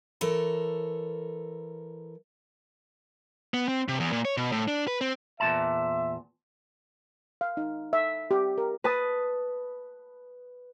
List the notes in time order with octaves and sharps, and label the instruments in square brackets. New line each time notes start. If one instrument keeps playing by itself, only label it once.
[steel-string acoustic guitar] E3 A4 A#4 C#5
[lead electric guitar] B3
C4
C3
E2
A#2
C#5
B2
A2
D4
B4
C4
[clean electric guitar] E2 A#2 A5 [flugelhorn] E5
[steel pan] F5
D#4
E5
G4
A#4
[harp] B4 A5 D#6